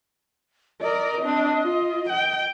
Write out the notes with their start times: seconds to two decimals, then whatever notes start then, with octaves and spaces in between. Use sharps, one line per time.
0.81 A#4 D5 D#5
1.21 C4 D4
1.63 F4
2.09 G5